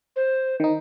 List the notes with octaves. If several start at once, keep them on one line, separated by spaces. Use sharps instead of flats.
C5
D#3 D#4